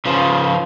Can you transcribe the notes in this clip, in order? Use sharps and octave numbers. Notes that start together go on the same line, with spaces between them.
C#3 F3 C#4 F4 B4